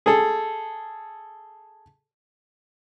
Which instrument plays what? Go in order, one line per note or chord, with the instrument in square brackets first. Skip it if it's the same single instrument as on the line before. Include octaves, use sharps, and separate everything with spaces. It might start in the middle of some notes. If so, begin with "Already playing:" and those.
[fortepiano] G#4 A4